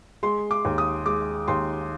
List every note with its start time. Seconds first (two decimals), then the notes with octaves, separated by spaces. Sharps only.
0.23 G#3 C6
0.51 D6
0.65 D#2
0.78 D#6
1.06 G#3 D6
1.48 D#2 C6